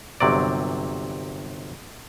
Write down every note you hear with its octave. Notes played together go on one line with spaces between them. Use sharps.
G1 C3 F#3 D5